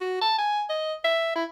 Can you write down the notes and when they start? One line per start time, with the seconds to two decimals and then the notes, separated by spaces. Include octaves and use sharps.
0.01 F#4
0.21 A5
0.38 G#5
0.69 D#5
1.04 E5
1.35 E4